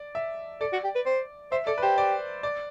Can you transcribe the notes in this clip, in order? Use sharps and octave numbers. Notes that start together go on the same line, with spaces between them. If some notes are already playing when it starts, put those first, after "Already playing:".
Already playing: D5
E5
A4 D5
F#4
G4
B4
C5
C5 E5
A4 D5
B4
G4 C5
D5
D5